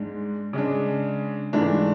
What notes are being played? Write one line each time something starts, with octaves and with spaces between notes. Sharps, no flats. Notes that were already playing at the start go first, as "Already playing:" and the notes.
Already playing: G#2 G#3 D4
C#3 G#3 D4
G#2 E3 A3 D4